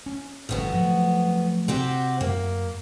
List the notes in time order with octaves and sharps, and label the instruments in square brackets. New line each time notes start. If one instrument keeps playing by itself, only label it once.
[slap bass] C#4
[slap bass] G1 A2 [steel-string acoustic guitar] F2 B3 F#4
[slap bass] F3 F#3 A3
[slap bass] C3 [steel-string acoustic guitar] C4 F#4 G4
[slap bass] F#2 [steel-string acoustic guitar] A#3